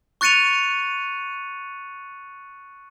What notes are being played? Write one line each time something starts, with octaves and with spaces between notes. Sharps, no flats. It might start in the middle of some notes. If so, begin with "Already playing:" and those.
C#6 F#6 A6 C#7 D#7 F7